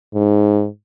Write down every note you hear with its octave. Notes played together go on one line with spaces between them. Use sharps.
G#2